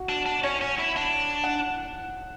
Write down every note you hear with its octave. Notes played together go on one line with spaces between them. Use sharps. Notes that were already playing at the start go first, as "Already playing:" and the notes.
Already playing: F#4
D4
D4
C#4 C#5
C#4
E4
D4
F#5